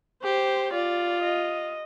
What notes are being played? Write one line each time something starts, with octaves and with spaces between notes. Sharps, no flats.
G4 C5
F4 D5
D#5